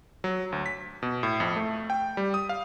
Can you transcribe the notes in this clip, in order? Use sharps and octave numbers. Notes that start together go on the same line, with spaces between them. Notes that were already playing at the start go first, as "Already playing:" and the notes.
F#3
D2
B6
B2
A2
F2
A3
G5
G3
D#6
F5